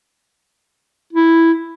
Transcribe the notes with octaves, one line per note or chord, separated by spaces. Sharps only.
E4